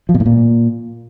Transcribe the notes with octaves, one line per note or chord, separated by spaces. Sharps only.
F3
B2
A2
A#2